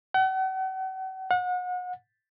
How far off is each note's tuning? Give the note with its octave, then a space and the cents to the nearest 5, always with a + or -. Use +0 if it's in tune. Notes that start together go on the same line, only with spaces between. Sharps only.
F#5 +40
F#5 -35